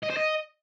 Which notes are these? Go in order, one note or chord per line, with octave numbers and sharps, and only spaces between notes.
D#5
C5
D#5